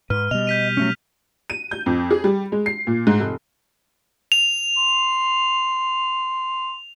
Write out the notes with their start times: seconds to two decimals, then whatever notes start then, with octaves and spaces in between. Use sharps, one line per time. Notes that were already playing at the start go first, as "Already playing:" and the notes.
0.10 G#2 B4 F6
0.31 B2 G3 D#5 F7
0.47 G6 B6 D#7
0.77 F#3 A3 C#4
1.50 D#7
1.71 G6
1.86 F2
2.11 G#4
2.24 G3
2.52 G#3
2.66 C7
2.87 A#2
3.07 G#2
3.20 F1
4.32 F7
4.79 C6